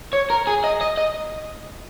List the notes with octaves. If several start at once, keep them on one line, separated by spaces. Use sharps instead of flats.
C#5
A#4
G#4
D#5
D#5
D#5